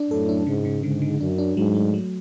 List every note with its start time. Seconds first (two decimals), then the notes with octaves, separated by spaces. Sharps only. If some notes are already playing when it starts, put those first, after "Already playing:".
Already playing: D4
0.11 F#2 A2 A4
0.29 D4
0.47 G#2 C#3
0.65 C#3
0.83 G#2 D3
1.02 D3
1.20 F#2 D4
1.38 D4
1.57 G#2 F#3
1.75 A3
1.94 F#3